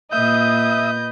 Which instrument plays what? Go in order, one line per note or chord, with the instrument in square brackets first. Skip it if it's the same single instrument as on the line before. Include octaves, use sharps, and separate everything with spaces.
[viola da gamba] A#2 [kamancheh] B4 D#5 [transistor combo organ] E5 D#6 [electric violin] G6